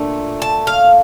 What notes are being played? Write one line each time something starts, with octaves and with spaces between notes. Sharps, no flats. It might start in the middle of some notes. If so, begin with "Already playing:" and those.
Already playing: A#2 A3 D4
A5
F5